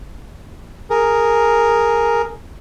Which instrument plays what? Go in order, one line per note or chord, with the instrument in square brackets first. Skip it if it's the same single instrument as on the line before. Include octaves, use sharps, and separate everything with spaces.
[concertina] G#4 A#4